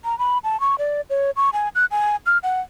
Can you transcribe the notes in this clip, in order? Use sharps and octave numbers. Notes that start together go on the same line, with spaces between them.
A#5
B5
A5
C#6
D5
C#5
C#6
G#5
F#6
G#5
F6
F#5